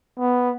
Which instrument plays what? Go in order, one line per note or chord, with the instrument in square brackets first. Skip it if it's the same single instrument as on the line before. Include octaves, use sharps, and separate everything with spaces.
[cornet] B3